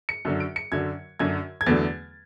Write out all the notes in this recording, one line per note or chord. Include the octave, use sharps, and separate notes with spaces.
C#7
F#2 D3 F#3
D7
C#7
F#2 D3 F#3 G#6
F#2 D3 F#3 G#6
G#6
E2 D3 F#3 A3 A6